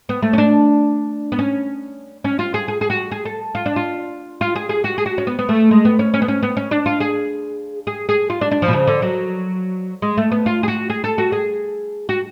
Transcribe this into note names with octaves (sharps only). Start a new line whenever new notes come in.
B3
A3
C#4
D4
B3
C#4
C#4
F4
G#4
G#4
G#4
F#4
G#4
A4
F4
D4
F4
F4
G#4
G#4
F#4
G#4
F#4
C#4
B3
B3
A3
G#3
B3
C#4
C#4
B3
C#4
B3
C#4
D4
F4
G#4
G#4
G#4
F4
D4
D4
F3
B2
C#3
D3
F#3
G#3
A3
B3
F4
G#4
F#4
G#4
A4
F#4
G#4
F#4